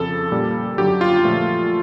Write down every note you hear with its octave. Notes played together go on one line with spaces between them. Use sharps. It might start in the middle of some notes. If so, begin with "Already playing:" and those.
Already playing: F2 C#3 F3 A4
A#2 G3 A#3
F#2 D3 F#3 G4
F4
A#2 F3 A3